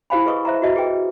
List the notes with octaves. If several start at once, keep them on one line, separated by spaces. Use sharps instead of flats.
E4 G4 C5 F5 G#5 B5
G#4 B4 D#5 C#6 D#6
C5 E5 A5 A#5
F#4 G4 D#5 E5 A5
G4 G#4 B4 G5